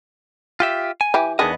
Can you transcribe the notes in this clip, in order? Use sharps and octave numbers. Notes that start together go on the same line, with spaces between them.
F4 G4 E5
G#5
E3 G4
E2 D#3 B3 D4 G#4 D#5